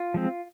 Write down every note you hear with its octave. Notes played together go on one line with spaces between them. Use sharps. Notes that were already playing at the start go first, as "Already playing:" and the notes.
Already playing: F4
F3 G#3 C4